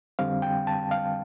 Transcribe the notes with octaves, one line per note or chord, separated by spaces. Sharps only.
F2 D3 G3 C4 F5
G5
A5
F5